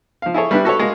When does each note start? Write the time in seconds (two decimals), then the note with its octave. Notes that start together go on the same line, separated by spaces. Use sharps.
0.22 F3 F5
0.34 E4 G#4 A4 C#5
0.51 G3 B3 D4 E4 B4
0.65 F#4 A4 B4 C#5
0.79 G#3 A#3 F#4